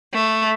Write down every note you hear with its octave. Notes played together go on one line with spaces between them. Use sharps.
A3